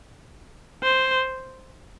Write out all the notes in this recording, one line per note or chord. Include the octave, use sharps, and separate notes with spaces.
C5